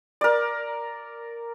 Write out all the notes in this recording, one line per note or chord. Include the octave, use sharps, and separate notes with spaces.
A#4 D5